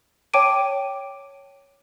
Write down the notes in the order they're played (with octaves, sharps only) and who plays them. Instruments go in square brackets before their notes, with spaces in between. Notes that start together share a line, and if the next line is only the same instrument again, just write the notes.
[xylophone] C#5 G5 A5 D6 D7 D#7